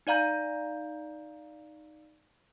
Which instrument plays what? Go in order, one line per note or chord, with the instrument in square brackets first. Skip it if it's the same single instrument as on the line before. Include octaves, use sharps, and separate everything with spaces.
[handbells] D#4 D5 F5 A#5 G6